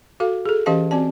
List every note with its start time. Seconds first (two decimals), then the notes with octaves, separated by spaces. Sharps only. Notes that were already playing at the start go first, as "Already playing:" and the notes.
0.20 F#4 A4 F5
0.46 G#4 A4
0.66 E3 C#4 G4 D#5 F5 A5
0.91 C4 F#4 D5 A5